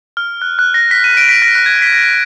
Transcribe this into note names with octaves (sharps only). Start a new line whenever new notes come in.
F6
F#6
F#6
A#6
B6
D#7
D7
B6
A#6
F#6
G#6
B6
A#6